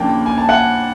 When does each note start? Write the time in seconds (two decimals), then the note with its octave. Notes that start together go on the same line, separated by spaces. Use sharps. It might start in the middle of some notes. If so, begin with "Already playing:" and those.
Already playing: D#2 C#3 F3 A#3 D4 G5 A5
0.26 G#5
0.38 A5
0.48 F#5 G#5